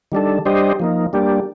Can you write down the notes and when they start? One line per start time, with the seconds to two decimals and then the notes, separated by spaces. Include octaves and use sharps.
0.12 D#3 G3 D4 A4
0.46 G3 D4 G4 C5 D#5
0.80 F3 A#3 D#4
1.13 G3 A#3 D4 G4